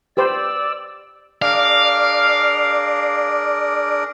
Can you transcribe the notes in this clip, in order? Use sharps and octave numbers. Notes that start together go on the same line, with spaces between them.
G4 B4 C5 D5 E6
D4 G#4 A#4 D5 F5